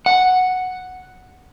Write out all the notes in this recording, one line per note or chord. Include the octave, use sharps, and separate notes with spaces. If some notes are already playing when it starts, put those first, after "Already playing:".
F#5